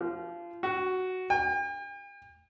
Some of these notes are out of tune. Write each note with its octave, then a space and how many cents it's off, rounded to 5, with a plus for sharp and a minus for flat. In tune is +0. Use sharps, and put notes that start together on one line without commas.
F3 -25
F#4 +5
G5 +45